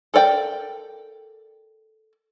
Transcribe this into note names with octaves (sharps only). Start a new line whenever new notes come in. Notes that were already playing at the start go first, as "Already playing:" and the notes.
A4 A#4 D5 G5